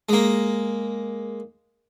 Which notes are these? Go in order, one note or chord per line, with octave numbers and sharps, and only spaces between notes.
G#3 A#3